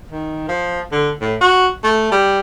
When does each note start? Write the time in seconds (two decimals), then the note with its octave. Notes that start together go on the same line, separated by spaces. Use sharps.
0.11 D#3
0.48 F3
0.92 D3
1.21 A2
1.41 F#4
1.84 A3
2.11 G3